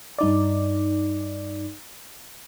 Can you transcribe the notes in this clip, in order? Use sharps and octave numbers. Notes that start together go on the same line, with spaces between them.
G2 D#4 D5